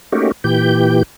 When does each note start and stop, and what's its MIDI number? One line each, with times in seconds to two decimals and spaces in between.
0.12 0.32 57
0.12 0.32 58
0.12 0.32 61
0.12 0.32 63
0.12 0.32 66
0.12 0.32 67
0.44 1.03 46
0.44 1.03 52
0.44 1.03 67
0.44 1.03 91